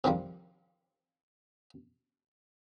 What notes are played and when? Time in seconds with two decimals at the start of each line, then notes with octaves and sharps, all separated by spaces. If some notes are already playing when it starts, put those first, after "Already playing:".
0.04 C3 D#3 F3 G3